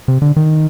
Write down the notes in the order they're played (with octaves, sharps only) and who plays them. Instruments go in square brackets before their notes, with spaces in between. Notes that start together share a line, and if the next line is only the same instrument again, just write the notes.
[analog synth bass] C3
D3
D#3